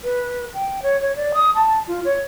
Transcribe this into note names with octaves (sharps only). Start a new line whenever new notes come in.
B4
G5
C#5
C#5
D5
D#6
A5
F4
C#5